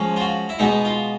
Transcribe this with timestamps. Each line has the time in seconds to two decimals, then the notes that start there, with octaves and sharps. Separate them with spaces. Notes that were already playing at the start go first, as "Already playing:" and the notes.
Already playing: F3 G#3 C#4
0.16 F4
0.20 F#4
0.49 E4
0.59 B2 G#3 B3 D#4
0.85 F4